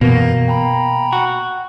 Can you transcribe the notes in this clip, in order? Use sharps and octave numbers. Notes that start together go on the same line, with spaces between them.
F#2 B2 E3 A#3
G5 A#5 B5
F#4